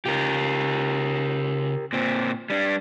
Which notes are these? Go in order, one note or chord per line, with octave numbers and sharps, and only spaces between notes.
C#3 F4 G4 A#4
A#2 C4
G3 D4